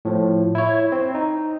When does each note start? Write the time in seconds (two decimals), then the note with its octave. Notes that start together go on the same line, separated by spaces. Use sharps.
0.05 A2 F3
0.55 E4 C#5
0.92 C4
1.15 D#4